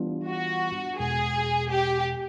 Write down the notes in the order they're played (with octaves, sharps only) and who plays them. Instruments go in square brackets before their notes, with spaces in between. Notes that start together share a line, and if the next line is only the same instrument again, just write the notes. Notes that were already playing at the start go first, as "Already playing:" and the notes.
Already playing: [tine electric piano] E3 G3 B3 D4 F4
[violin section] F#4
[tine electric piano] E2 B2 G#3 [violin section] G#4
[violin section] G4